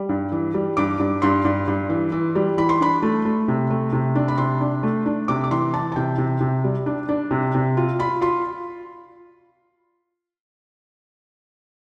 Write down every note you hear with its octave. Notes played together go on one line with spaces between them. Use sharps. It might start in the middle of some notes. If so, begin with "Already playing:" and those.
Already playing: G3
G2
E3
G3
G2 D6
G2
G2 C6
G2
G2
E3
E3
G3
E3 B5
C6
D4 B5
A3
A3
C3
A3
C3
D4
B5
C3 C6
D4
A3
D4
C3 D6
D6
E3 C6
E3 A5
A5
C3 G5
C3
C3
G3
D4
D4
C3
C3
F4
F4 B5
F4 C6